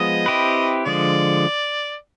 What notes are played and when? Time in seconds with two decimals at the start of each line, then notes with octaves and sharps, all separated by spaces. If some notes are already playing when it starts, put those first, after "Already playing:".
Already playing: F3 G#3 B3 G#4 D#5
0.26 C4 E4 G4 B4
0.86 D3 F3 G#3 D5